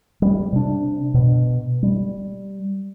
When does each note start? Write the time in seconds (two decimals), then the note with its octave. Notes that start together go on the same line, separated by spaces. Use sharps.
0.22 G3
0.52 C3 D4
1.14 B2
1.83 G3